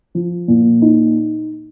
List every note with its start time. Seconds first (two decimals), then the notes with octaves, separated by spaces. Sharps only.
0.15 F3
0.48 A#2
0.82 D#4